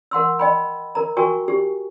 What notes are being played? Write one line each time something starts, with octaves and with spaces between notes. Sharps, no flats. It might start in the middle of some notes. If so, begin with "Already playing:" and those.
A#4 F#5 C6 E6
D#5 G5 B5
A#4 A#5
F#4 A#4 G5 G#5 C#6
G4